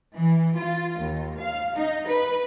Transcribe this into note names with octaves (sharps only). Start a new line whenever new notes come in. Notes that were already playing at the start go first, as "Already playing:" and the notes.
E3
F4
D#2
F5
D#4
B4